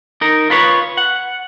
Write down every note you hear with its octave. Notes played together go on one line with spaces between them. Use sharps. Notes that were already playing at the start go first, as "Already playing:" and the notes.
D#4 A#4
F4 B4 C#5
F#5